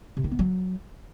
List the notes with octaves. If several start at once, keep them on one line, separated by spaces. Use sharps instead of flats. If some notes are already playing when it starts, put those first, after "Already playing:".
C3
D#3
B3
F#3